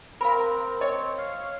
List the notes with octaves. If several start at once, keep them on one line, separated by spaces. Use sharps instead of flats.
C4 A#4 F5 B5
C#5 D#5
F5